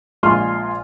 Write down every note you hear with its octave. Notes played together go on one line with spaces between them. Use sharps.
A#1 G#3 F4 C6 F6